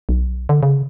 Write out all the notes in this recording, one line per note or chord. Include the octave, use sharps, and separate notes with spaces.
B1
D3
C#3